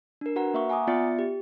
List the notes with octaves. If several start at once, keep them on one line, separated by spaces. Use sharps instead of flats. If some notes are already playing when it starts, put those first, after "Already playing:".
D4 A#4
F#4 B4 F#5 A#5
A#3 E5 F5 C#6
F#5 G#5 A#5 D6 D#6
B3 F4 D5 E5 A6 C#7
G4